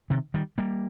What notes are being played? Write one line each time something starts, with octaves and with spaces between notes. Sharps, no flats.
C3 D#3
D#3 G3
G3 A#3